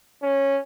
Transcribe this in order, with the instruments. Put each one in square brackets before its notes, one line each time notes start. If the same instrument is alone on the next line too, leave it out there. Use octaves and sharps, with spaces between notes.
[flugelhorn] C#4